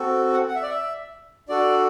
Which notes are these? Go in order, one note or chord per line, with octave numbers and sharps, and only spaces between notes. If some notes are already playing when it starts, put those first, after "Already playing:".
Already playing: C4 F#4 A4
F#5
F#5
E5
D5
E5
D4 F#4 A4 D5